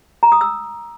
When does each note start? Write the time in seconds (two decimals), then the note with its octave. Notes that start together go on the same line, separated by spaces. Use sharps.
0.23 A#5
0.32 D#6
0.41 E6